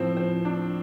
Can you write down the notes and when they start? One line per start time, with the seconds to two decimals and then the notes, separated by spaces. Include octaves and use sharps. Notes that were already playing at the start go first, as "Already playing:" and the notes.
Already playing: A2 F3 C4
0.17 C4
0.45 D4